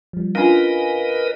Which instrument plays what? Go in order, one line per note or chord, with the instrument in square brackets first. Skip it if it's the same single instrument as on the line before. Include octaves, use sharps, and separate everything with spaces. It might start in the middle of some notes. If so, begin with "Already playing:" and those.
[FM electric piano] F3 G3
[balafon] C#4 D4 F4 [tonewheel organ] A#4 B4 D#5 [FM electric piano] F5 G#5